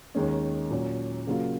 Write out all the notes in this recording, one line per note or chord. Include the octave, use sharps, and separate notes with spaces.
D#2 D#3 G#3 C#4
A#2 F#3 C#4
C#3 F#3 A#3 C#4 F4